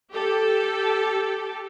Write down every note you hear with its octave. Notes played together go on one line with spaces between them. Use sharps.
G4 A4